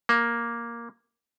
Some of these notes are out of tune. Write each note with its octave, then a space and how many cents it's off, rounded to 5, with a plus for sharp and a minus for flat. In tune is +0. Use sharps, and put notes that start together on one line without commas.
A#3 +5